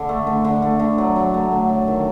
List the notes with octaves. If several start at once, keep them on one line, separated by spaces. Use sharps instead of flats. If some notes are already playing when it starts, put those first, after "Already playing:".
Already playing: D3
A3
D3
D3
A3
D3
F#3
F#3
A3
D3
F#3
D#3